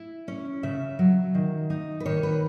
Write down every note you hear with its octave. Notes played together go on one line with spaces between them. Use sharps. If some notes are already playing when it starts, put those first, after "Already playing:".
Already playing: E4
C#4
C#3 E5
F#3
D#3
D#4
B4
D#3 C#5
B4